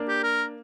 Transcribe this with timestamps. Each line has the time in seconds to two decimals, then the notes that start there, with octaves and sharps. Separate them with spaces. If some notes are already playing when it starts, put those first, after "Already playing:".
Already playing: A#3 D4
0.08 G4
0.23 A#4